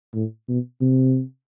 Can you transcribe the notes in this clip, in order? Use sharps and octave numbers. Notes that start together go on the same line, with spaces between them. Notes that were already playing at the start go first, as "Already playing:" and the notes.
A2
B2
C3